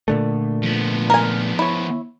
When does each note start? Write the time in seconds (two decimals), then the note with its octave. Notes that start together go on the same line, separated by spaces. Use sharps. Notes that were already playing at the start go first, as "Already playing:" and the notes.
0.08 A#2 D3 A3
0.63 F3 B3
1.10 A#4 G#5
1.59 E4 C#5